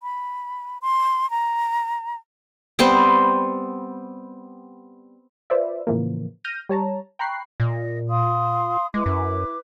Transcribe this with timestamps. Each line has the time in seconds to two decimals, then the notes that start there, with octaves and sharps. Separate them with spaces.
0.03 B5
0.82 C6
1.30 A#5
2.79 G3 B3 C4 C5
5.50 F4 B4 C5 D5 E5
5.87 A2 C#3 E3 F3 A#3
6.44 F6 G6 A#6 D#7
6.69 G3 C#5 A5 A#5
7.19 G5 A#5 B5 C#6 F#6 C7
7.60 A#2 D#5
8.08 F5 C6 D#6
8.94 G#3 E4 B4 D6
9.06 F#2